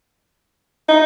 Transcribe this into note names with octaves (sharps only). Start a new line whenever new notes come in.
D#4